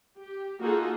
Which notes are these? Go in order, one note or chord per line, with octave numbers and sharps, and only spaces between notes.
G4
A#3 D#4 F4 F#4 G#4 A4